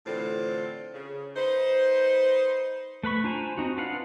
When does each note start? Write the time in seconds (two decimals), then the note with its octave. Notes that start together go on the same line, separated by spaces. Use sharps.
0.06 A2 D3 E3 C4 F4
0.94 C#3
1.36 D#4 B4 C5
3.03 A3 B4 B5 C#6
3.24 D4 F4 C5 G#5 A#5
3.57 C4 D#4 F#4
3.78 D4 F4 B4 F5 F#5